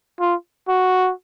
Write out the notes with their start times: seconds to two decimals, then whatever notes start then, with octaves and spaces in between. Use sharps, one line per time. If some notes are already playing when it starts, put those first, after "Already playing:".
0.20 F4
0.68 F#4